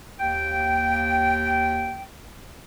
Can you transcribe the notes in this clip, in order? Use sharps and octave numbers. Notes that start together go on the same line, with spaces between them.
D#2 G5